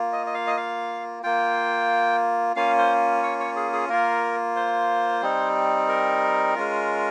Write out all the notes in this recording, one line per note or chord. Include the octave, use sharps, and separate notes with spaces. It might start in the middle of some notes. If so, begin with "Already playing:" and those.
Already playing: A#3 F4
D#5
D#5
F5
D#5
F5
A#3 F4 G5
A#3 C#4 F4 F5
C5
C#5
C#5
G#4
G#4
A#3 F4 A#4
C5
G3 C4 D#4
A#4
G#3 C#4 F4